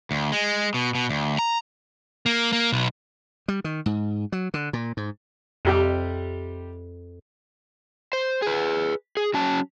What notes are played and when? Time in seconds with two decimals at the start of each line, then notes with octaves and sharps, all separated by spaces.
0.11 D2
0.32 G#3
0.74 B2
0.95 B2
1.09 D2
1.39 A#5
2.26 A#3
2.53 A#3
2.72 B1
3.48 G3
3.64 D#3
3.86 G#2
4.32 F#3
4.54 D3
4.73 A#2
4.97 G#2
5.65 F2 C3 G3 G4
8.13 C5
8.42 G#4 B4
9.17 G#4
9.34 F#3 C#4 A5